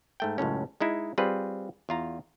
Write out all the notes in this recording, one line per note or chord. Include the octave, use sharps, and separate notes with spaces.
G#2 A3 G5
C#2 F#2 A2 C#4
G#3 D#4 E4
G3 C4 F4 G#4 B4
E2 F4 A#5